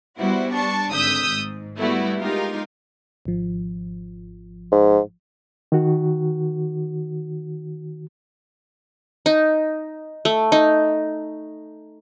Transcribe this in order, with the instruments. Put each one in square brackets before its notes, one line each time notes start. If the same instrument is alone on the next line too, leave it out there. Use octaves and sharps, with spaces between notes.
[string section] G3 B3 E4 F#4 C5
D4 A5 C#6
G#1 D3 D#6 E6 G6 B6
G#2
G3 A3 B3 E4 F#4
G#3 D#4 F4 G4 A#4 F5
[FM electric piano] G#1 F3
[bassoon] G#2
[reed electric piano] D#3 F#4
[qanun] D#4
A3
D#4